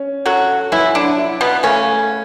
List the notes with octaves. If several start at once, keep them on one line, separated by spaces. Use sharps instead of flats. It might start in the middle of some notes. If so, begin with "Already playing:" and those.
Already playing: C#4
F#3 F#4 A4
E3 F#3 E4
D3 D4
E4
B2 B3
C#3 A3 C#4